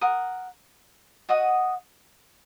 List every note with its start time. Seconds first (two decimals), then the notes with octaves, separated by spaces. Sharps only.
0.01 A#4 F#5 D#6
1.29 F#4 D#5 F#5 D#6